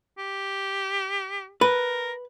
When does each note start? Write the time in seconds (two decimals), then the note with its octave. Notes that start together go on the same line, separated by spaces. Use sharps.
0.18 G4
1.61 A#4 B4